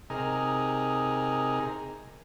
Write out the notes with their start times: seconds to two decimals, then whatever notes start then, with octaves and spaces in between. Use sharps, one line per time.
0.10 C3 D#4 G#4 A#4